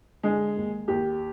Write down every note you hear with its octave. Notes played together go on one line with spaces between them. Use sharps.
D3 G#3 G#4
D#2
D#2 G4